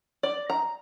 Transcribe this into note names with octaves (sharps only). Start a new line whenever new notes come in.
D5
A#5